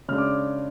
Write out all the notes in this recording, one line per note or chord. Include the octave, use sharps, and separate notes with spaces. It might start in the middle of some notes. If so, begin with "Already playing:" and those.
C#3 G#3 D4 F6
D6